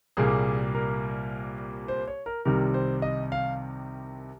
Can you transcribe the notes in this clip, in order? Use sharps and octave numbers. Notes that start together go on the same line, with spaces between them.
C2 A#2 G3 A#3 G#4
A#4
C5
C#5
A#4
C2 C3 D#3 G3 A#4
C5
D#5
F5